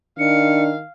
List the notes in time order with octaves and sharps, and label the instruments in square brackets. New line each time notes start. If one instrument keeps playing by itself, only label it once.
[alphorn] D#3 [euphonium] D4 [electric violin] F5 [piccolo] C#7